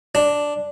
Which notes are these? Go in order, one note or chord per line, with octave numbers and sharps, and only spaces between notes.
D4